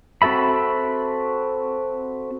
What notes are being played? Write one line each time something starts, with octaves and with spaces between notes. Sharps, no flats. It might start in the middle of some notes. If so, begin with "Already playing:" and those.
C4 F#4 A4 E5 B5